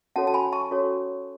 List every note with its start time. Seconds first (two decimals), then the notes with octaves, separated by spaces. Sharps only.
0.16 C#4 F#4 A4 C#5 F#5 A5
0.27 A5
0.34 G#5 B5
0.52 A5 C#6
0.71 C#4 F#4 A4 C#5